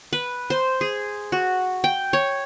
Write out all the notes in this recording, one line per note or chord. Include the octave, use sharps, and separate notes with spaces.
B4
C5
G#4
F#4
G5
C#5